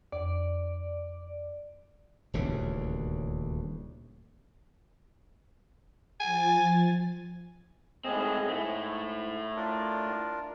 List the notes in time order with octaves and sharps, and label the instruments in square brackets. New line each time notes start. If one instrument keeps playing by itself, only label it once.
[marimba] F2 [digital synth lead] D5
[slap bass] D#1 D2 C#3 E3
[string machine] F3 A6 [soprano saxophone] G#5
[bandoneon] A2 G#4 D#5 [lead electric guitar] G#3 C4
[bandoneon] G#2 [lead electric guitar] A3 E4
[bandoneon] D4 F4 A#4